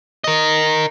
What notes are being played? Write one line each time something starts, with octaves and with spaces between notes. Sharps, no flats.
A#4 D#5